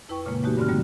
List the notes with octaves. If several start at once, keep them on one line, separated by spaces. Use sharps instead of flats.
F2 E4 B4 G5 C#6
A#2 C#3 G#3 A#3
E3 G#3 A3 D#4 F#4 G4
G2 D3 C4 F6
B2 D3 F#3 G3 A#3